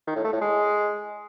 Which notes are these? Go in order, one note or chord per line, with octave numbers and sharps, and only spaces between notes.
D#3
A2
A3
A2
G#3